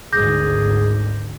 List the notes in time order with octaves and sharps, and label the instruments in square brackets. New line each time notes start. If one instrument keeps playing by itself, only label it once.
[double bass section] G#1 D2 G#2 [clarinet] G#4 [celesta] D6 G6 A#6